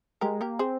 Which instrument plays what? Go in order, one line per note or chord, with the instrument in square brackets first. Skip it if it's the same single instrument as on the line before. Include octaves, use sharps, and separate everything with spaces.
[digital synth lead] G#3 [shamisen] G4 A#4
[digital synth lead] A#3 [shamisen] G4 A#4
[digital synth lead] C4 [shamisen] G#4 C5